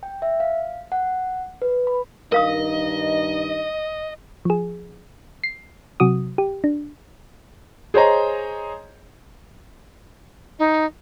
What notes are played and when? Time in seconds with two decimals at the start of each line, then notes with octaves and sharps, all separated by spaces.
0.03 G5
0.22 E5
0.40 F5
0.92 F#5
1.62 B4
1.87 B5
2.32 G2 D#3 D#4 A#4 D#5 F5 D#6
4.45 F3 G#4
5.44 C7
6.00 C3 F#3 F#4 D#6
6.38 G4
6.64 D4
7.94 G#4 C5 C#5 D#5 A#5
10.59 D#4